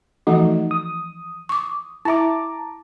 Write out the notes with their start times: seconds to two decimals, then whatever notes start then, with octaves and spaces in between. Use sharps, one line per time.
0.27 E3 F3 A3 D#4 F#4
0.71 D#6
1.49 C#6 D6
2.05 E4 E5 A5 A#5 D6